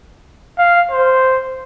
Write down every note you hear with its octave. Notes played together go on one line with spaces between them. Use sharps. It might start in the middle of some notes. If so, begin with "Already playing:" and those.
F5
C5